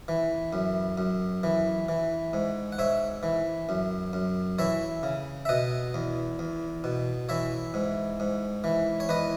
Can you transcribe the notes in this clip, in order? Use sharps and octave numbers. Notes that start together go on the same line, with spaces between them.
E3
F#2
F#2
E3
E3
G#2
F#5
G#2 C#5 E5
E3
F#2
F#2
E3 C#5 E5
C#3
E5
B2 D#5 F#5
E2
E2
B2
E3 C#5 E5
G#2
G#2
E3
C#5
E2 B4 D#5